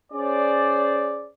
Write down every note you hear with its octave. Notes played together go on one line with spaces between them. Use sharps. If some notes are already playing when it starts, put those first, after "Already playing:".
C#4 G#4 C5 D5